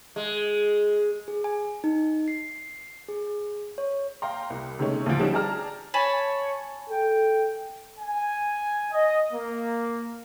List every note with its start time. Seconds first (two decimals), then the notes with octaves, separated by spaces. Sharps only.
0.16 G#3
1.28 G#4
1.44 G#5
1.84 D#4
2.28 C7
3.08 G#4
3.78 C#5
4.22 F5 G5 A#5 C6
4.50 C2
4.79 C3 D#3 G#3 A3 C#4
5.06 D2 A2 D3 E3 F3 D7
5.19 D3 G3 C#4 D#4 F#4 E7
5.33 G4 G#4 D5 A5 A#5 F6
5.94 C#5 G#5 A5 B5
6.90 A4 G5
7.99 G#5
8.91 D#5
9.32 A#3